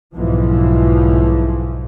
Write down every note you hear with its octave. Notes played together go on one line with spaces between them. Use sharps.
B1 G#2 E3 F3